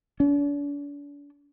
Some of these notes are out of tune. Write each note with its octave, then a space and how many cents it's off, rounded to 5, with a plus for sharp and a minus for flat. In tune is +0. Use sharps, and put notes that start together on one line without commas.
D4 -40